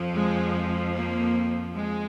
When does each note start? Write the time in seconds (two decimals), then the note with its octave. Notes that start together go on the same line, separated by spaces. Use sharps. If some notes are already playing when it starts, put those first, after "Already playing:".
Already playing: F2 F3
0.15 G#3
0.95 A#3
1.75 G#3